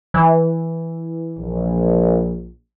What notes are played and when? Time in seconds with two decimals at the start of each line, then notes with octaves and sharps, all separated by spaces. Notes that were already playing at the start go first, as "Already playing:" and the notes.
0.14 E3
1.38 A#1